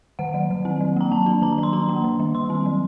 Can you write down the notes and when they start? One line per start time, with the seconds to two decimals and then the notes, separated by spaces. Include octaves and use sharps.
0.19 D#3 F#5
0.34 F#3
0.50 D#3
0.65 C4
0.80 F#3
0.96 A#3 A#5
1.12 F#3 A5
1.26 D4
1.42 D#3 A#5
1.53 A#5
1.58 F#3
1.63 C6
1.73 D4 A#5
1.89 A#3
2.04 D#3
2.20 G3
2.35 D#3 C6
2.50 C4
2.66 F#3